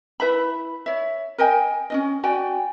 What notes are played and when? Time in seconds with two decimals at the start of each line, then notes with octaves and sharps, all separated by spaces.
0.20 E4 B4 E5 B5
0.86 C#5 E5
1.38 A#4 D#5 G5 G#5
1.90 C#4 D4 D#5
2.23 F#4 D5 G5 G#5